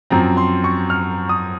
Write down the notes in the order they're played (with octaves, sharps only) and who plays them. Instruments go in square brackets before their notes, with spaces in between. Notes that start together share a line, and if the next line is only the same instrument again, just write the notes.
[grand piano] F#2 F3 C4 A#5
C6
C#6
F6
D#6